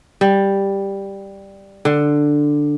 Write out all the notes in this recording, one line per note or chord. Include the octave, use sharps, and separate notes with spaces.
G3
D3